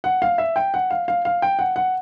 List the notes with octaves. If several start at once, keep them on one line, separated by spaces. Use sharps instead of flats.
F#5
F5
E5
G5
F#5
F5
F5
F5
G5
F#5
F#5